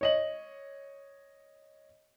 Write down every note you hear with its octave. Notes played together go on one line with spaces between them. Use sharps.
C#5 D#5 F#7